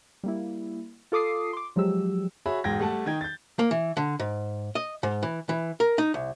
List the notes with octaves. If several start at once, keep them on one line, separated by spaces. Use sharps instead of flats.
G3 A#3 E4
F4 A4 D6 D#6 C7
C6 D6
F3 F#3 G#3 G4 E6
F#4 G#4 C#5 E5 B5
E1 G#2 G5 G#6 A#6
G3 A3 F#5 A5
D#3 D#4 G5 G#6
G6 A6
A#3
E3
D3
G#2
D#5
G#2
E3
E3
A#4
D#4
C2